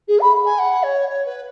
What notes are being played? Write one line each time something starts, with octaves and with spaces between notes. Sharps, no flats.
G#4
B5
G#5
F#5
C#5
C#5
B4